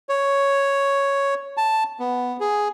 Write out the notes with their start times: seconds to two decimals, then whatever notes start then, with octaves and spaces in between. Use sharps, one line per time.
0.09 C#5
1.57 A5
1.99 B3
2.40 G#4